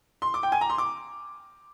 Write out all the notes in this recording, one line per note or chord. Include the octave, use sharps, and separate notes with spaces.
C6
D6
G5
G#5
A#5
C6
D6